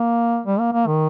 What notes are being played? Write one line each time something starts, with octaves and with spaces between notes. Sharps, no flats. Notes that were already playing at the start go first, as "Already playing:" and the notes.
Already playing: A#3
G3
A#3
A#3
D#3